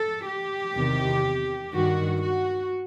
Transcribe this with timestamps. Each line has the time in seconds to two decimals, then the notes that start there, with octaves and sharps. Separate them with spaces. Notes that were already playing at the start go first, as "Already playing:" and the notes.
Already playing: A4
0.27 G4
0.75 E2 C3 D#3
1.72 G2 D#3 F#4
2.21 F#4